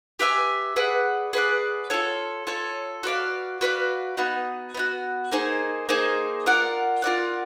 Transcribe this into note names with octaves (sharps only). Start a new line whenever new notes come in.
G4 B4 E5 G#5
G#4 B4 D5 F#5
G#4 B4 D5 F#5
F4 A4 C#5
F4 A4 C#5
F#4 B4 D5 F5
F#4 B4 D5 F5
B3 D#4 F#4
B3 D#4 F#4
A#3 D#4 G#4 C5
A#3 D#4 G#4 C5
F4 A#4 D5 F#5
F4 A#4 D5 F#5